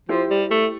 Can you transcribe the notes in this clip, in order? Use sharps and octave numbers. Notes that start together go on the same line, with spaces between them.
F3 E4 G4 C5
G3
A3